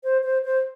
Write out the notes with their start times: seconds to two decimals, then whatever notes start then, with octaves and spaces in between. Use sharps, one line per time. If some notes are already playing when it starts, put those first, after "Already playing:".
0.04 C5
0.24 C5
0.45 C5